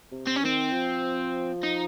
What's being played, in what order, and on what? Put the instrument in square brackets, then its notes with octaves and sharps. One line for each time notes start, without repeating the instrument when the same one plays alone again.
[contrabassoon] C3
[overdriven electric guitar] C4
C#4
[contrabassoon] D#3 [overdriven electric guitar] C4
[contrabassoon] F3
[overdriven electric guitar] D#4